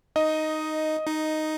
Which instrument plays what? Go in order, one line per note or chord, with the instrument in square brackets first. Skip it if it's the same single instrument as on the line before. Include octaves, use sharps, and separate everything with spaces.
[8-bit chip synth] D#4 [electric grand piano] D#5
[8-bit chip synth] D#4